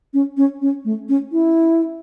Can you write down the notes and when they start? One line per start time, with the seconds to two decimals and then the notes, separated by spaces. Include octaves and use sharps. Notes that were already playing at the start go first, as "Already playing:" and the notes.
0.14 C#4
0.37 C#4
0.62 C#4
0.85 A3
1.09 C#4
1.32 E4